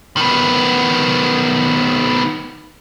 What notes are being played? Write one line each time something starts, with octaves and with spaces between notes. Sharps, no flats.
D#3 B3